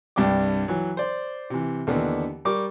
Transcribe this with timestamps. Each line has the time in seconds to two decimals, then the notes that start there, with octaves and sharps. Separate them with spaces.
0.16 C2 G2 D4 G5 D6
0.68 E3 F#3
0.97 C5 D5
1.50 C3 E3
1.87 D#2 D3 E3 B3 D4
2.45 G3 A#4 C#6 D6